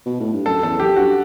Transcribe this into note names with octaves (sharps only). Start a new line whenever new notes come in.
B2
A2
G2
F#2 A4
E2 A4
F#2 G4
G2 F#4